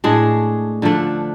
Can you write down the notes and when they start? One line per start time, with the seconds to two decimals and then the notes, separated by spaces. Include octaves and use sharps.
0.04 A2 G#3 D4 G#4
0.82 D3 F3 A3 D4